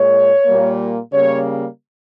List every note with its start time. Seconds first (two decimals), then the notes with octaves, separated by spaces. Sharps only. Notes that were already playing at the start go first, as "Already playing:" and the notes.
Already playing: A#2 G#3 C#5
0.46 A#2 G3 A#3
1.12 C#3 G3 A#3 C#5